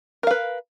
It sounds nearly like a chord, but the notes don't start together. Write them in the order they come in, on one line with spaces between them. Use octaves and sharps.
A#4 F5 B4